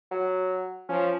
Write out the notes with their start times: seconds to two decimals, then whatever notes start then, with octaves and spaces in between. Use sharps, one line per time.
0.11 F#3
0.89 F3 C#4